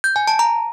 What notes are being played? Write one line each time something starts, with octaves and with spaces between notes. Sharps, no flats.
G6
G#5
A5
A#5